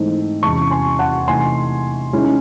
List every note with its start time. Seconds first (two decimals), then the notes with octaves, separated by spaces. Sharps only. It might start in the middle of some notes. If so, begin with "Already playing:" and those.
Already playing: G#2 E3 A3 C4 D#4
0.42 E2 C3 E3 G#3 C#4 A5 C#6
0.70 G#5 C6
0.99 F#5 A5
1.28 C3 E3 A3 D#4 G#5 C6
2.13 D#3 G#3 C#4 E4